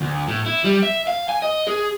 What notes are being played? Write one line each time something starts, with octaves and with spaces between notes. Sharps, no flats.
D2
A2
E4
G3
E5
F5
G#5
D#5
G#4